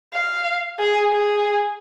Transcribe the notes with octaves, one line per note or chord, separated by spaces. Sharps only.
F5
G#4
G#4